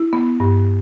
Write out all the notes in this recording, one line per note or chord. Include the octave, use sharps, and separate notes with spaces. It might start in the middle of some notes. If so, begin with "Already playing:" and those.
Already playing: E4
B3
G2